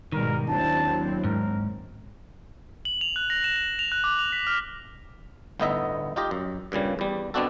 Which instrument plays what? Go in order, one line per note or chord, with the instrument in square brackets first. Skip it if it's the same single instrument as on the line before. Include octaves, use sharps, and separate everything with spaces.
[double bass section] G#2 B2 G3 [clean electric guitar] D#3 [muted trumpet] A#4
[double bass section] D#2 F#3 C4 [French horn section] D4 E4 [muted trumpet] A5
[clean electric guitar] G#2 [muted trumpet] A#4
[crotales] F#7
F7
F#6
A#6
E7
F#7
F7
F#6
D6
F7
B6
F6
[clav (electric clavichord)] G1 A2 B3 D#4 D#5 E5
D#4 F4 G4 D#5
F#2
G2 A#2 C#3 G3
E2 G3
B2 B3 C4 D4 F#4 A4